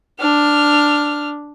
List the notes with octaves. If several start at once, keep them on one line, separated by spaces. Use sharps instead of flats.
D4 F6